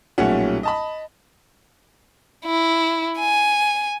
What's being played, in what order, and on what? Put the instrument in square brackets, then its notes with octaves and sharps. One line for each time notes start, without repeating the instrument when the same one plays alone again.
[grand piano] B1 A#2 G3 A3 C#4 F#5
D#5 A5 B5
[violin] E4
G#5